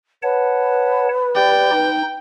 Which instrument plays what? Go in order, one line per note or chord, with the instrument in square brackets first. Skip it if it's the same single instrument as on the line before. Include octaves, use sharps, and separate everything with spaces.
[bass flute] B4 [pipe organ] C#5 F#5 A5
[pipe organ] G4 D5 A6 [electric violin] G5
[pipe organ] D#4